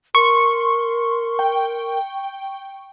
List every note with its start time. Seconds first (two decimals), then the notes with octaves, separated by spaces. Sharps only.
0.15 A#4 C6 C#6
1.39 G5